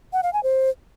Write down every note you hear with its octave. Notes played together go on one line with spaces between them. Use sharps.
F#5
F5
G#5
C5